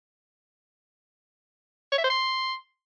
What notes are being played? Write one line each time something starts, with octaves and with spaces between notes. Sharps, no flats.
C#5
E5
C5
C6